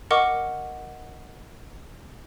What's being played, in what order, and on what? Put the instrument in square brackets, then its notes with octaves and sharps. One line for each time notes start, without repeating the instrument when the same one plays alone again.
[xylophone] A#4 D#5 F#5 C#6 D6 F6